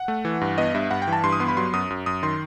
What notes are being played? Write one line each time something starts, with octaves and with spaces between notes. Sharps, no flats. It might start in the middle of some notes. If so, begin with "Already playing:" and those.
Already playing: F#5
A3
E3
G2
B3 D#5
G2 E5
G2 F#5
G5
E3
A5
G2 C6
D#6
B3 C6
B5
F#3 C6
F#2 D#6
F#2
F#2 D#6
D#3 C6